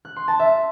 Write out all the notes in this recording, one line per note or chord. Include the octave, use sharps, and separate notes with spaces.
F#6
C6
A5
E5